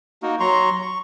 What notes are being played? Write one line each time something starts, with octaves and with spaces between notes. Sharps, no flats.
A#3 D#4 F#4
F#3 A#5 C6 C#6
C#6